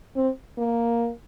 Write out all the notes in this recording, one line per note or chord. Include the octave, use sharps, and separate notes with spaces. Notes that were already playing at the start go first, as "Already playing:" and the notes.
C4
A#3